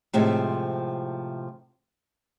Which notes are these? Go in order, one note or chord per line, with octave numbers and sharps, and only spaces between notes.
A2 C3 F3 G#3